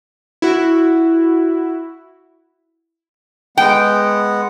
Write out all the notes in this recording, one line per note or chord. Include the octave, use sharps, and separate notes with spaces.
E4 F#4
G#3 B3 F#5 G5